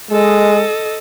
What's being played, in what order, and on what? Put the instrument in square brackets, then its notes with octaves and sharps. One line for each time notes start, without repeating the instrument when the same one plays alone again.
[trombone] G#3 [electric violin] A4 D#5